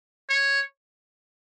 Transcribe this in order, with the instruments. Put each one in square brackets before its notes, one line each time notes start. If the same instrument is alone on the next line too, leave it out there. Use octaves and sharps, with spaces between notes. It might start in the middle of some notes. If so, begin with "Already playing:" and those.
[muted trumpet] C#5